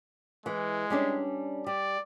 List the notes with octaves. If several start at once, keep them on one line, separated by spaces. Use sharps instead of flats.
E3 G#3
G3 C#4 D4
G3 D5